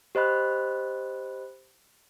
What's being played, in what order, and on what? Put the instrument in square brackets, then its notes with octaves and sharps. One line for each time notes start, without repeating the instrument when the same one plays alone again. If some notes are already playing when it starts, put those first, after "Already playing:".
[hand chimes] G4 C5 D#5 B5 F#6